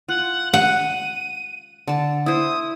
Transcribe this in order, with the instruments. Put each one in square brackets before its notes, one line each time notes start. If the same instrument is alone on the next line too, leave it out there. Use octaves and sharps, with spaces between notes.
[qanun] F4 [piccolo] F#5
[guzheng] F#5 [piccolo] D#7
[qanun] D3 A5
[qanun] E4 C5 [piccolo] D#6